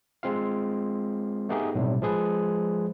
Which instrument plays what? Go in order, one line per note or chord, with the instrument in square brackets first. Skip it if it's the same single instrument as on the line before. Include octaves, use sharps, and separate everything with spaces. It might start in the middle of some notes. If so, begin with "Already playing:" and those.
[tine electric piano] G#3 C4 F4 F5
A3 B3 D#4 G4 G#4
B1 A2 C3 G3
F3 G#3 G#4 B4